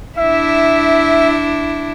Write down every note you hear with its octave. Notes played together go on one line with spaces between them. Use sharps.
D4 E4 E5